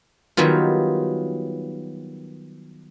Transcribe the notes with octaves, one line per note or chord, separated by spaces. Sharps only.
D#3 F#3 G3 B3 F4